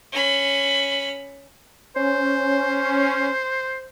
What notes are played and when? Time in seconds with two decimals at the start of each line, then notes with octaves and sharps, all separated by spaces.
0.12 C#4 B5
1.96 C#4 C5